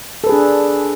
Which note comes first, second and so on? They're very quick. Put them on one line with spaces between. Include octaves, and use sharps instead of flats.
A4 B4 G#4 D4